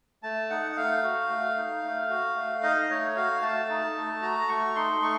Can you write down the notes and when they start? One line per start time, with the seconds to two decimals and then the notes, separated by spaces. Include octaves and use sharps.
0.23 A3 A5
0.50 D#4 F#5
0.72 F#5
0.77 A3 F5
1.03 F#4
1.30 A3
1.56 D#4
1.83 A3
2.09 F#4
2.36 A3
2.63 D#4 D#5
2.90 A3 C#5
3.16 F#4 F5
3.42 A3 A5
3.70 D#4
3.96 A3
4.22 F#4 A#5
4.49 A3 C#6
4.75 D#4 C6
5.02 A3 C#6